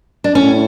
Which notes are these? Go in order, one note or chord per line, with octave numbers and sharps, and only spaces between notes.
D4
A2 C#4